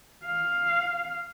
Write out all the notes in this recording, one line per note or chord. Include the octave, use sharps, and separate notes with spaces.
F5